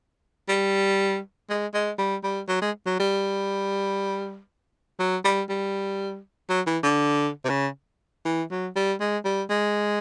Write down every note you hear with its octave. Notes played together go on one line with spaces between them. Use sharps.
G3
G#3
G#3
G3
G3
F#3
G#3
F#3
G3
F#3
G3
G3
F#3
E3
D3
C3
C#3
E3
F#3
G3
G#3
G3
G#3